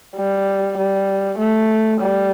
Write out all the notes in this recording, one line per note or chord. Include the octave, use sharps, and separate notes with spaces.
G3
G3
A3
G3